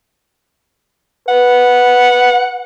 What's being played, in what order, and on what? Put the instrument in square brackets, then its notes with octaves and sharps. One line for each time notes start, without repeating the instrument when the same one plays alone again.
[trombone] B4 [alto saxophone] F#5